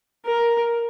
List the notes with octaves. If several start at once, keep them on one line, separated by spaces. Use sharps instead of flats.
A#4